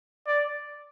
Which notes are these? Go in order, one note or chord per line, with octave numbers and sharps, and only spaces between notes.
D5